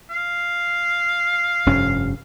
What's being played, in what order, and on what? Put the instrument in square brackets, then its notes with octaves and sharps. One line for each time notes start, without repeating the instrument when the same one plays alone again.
[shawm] F5
[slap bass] F1 G2 C#4